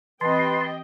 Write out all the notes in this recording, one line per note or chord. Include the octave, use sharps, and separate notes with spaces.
E3 C4 G4 B4 D#5 G5 A5 C6